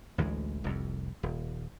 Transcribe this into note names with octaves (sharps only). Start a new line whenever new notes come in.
A1 D2 E3 G#3
F1 C2 F2
D#1